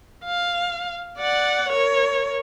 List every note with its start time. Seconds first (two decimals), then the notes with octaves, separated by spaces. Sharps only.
0.24 F5
1.18 D5 F#5
1.68 A#4 C#5